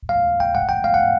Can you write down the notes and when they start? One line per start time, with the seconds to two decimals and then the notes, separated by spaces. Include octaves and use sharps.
0.09 F5
0.40 G5
0.55 F#5
0.69 G5
0.84 F5
0.94 F#5